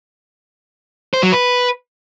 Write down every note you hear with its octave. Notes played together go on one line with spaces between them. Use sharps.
C5
F#3
B4